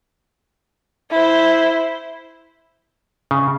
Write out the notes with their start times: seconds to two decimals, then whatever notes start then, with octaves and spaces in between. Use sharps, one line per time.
1.11 E4 C5
3.31 C#3